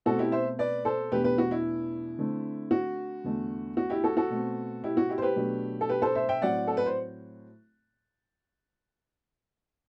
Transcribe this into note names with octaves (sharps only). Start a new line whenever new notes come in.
B2 A3 C4 F#4 A4
E4 G4
C5 E5
B4 D5
A4 C5
E2 B2 A3 D4 G4 B4
G4 B4
F#4
E4
D3 A3 C4
F#4
E2 D3 A3
F#4
E4 G4
F#4 A4
F#4 A4
B2 A3 C4
E4 G4
F#4
E4 G4
C5
G4 B4
B2 F#3 A3 D4
A4
G4 B4
A4 C5
C5 E5
E5 G5
A2 F#3 C4 D5 F#5
A4
B4
C5